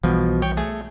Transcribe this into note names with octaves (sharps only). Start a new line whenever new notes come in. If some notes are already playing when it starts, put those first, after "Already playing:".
B1 B2 E3 F3 G3
C#5 G5
A3 G#4 G#5